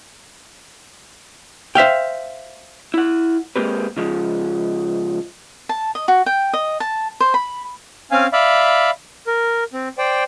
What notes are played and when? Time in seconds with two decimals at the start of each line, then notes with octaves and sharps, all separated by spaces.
1.75 C5 E5 F5 G5
2.94 E4 F#5
3.56 G#3 A#3 C4 G4 B4
3.97 C#3 F3 G#3
5.69 A5
5.95 D#5
6.08 F#4
6.26 G5
6.53 D#5
6.80 A5
7.20 C5
7.34 B5
8.11 C4 C#4 F5 G#5
8.33 D5 E5 F5 B5
9.27 A#4
9.73 C4
9.98 C5 D5 G5